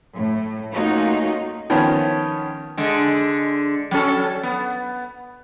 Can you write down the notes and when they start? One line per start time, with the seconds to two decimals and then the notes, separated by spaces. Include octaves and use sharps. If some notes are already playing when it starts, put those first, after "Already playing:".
0.15 A2
0.72 A3 A#3 C#4 D#4 F4 F#4
1.70 D#3 F3 B3 C#4 F4
2.78 D3 G#3
3.91 F#3 C#4 A4
4.43 B3